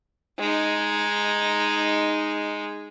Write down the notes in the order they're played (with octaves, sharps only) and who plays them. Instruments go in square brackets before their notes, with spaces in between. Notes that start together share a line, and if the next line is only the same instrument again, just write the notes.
[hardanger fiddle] G#3 D#4